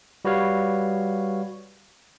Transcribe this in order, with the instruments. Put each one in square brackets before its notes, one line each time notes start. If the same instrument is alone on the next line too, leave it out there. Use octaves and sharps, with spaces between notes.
[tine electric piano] G3 F#4 B4 C#5 F5